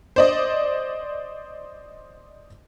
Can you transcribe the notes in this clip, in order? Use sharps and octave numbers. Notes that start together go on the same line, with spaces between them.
C5 D5 D#5